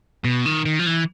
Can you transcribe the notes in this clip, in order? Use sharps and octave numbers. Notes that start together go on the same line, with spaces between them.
B2
D#3
D#3
F3
E3